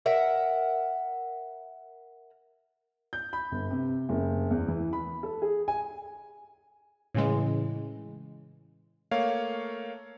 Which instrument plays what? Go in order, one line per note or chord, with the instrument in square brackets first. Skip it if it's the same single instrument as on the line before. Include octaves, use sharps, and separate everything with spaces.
[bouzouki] A#4 E5 F#5
[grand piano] G6
B5
G1
C3
F#1
E2
E3
B5
A4
G#4
G#5
[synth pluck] A2 C#3 E3 G#3
[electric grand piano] A3 A#3 C#5 F5